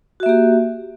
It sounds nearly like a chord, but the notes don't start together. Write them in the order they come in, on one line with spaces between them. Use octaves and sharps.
F#4 E5 A#3 G4